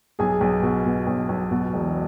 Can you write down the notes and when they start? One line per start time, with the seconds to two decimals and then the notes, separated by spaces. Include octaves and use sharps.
0.19 B1 G#4 G#5
0.41 B1
0.62 B2
0.85 B2
1.07 B1
1.29 B1
1.51 B2
1.74 E1